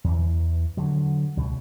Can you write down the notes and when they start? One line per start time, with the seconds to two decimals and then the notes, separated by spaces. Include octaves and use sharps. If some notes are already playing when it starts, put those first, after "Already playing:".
0.04 E2 E3
0.77 D3 F#3
1.37 C#2 B2